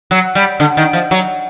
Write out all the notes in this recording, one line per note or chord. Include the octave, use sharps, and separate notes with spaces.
F#3
G3
D3
D#3
F3
F#3